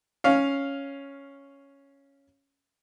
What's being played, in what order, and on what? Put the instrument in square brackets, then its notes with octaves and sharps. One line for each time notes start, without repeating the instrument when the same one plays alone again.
[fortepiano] C#4 F5